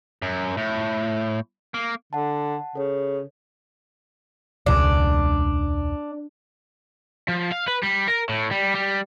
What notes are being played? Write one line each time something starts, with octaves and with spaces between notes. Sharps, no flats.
F#2
A2
A#3
D3 F#5 A5
C#3 A4 C#5
E1 C#2 C#3 D4
F3
F5
B4
G3
A#4
A2
G3
G3